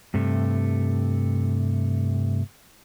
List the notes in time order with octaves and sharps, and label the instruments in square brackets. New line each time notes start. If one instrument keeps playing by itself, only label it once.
[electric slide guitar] G2 C3 A3